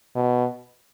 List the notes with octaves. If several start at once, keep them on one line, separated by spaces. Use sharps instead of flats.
B2